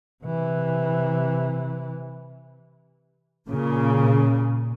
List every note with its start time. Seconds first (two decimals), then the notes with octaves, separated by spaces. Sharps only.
0.24 C3 E3
3.48 A#2 C#3